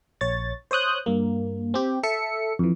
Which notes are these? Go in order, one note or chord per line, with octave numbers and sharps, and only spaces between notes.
A#1 C#5 A6
C5 C#5 D#6 F#6 G6
G2 A#3
C4 G4
A4 E5 C#7
F2 E3